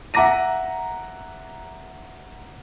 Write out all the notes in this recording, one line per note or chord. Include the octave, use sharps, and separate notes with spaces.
E5 F#5 A#5 D6 A#6 D#7